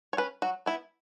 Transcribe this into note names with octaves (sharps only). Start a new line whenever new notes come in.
C#5
C#4 B4
F#3 F#4
B3 E4